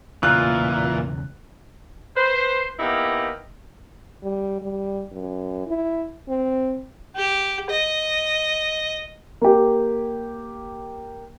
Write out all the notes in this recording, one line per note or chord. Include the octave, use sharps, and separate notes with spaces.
B1 E2 A#2 C#3 E3 F4 F#6
B4 C5
A#3 B3 D#4 E4 G4 A#4
G3
G3
F#2
E4
C4
G4
D#5
A#3 G4